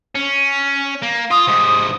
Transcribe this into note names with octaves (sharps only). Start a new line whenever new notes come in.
C#4
A#3
F4 D#6
G#2 C3